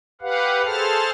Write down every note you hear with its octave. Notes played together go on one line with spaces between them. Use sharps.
G4 B4 F5 F#5
G#4 A4 C5 A5 F6